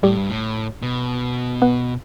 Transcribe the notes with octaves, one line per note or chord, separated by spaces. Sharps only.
A2 G3 G4
G2
A2
B2
B3 B4